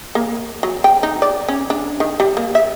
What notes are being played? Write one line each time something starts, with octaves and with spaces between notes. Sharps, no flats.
A#3
F#3
G5
D#4
D5
C#4
D4
D#3
G3
A#3
E5